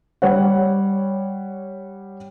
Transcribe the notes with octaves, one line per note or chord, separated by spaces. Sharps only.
G3 C#5 F#5